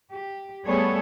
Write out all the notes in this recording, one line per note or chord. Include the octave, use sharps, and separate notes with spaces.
G4
G3 A3 B3 G#4 A4 C#5